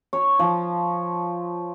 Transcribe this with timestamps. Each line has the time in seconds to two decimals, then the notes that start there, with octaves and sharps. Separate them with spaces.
0.13 C#5
0.39 F3